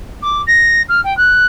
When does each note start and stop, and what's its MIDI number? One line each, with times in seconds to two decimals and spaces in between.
0.22 0.41 86
0.47 0.82 94
0.88 1.00 89
1.04 1.16 79
1.17 1.46 90